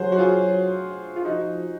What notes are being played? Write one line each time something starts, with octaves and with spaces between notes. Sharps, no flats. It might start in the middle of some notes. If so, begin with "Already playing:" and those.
Already playing: F#3 F#4 G#4 C5
F#4
F4 G#4
F4
F3 D#4 F#4